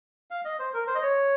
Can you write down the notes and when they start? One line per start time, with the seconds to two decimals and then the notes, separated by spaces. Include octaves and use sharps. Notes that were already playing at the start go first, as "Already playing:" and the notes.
0.31 F5
0.45 D#5
0.59 C5
0.74 A#4
0.87 C5
0.95 D#5
1.02 C#5